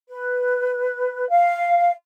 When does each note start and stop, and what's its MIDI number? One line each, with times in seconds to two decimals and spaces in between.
0.08 1.28 71
1.29 1.90 77